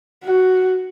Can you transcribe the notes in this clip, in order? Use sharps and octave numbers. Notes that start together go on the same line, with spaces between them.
F#4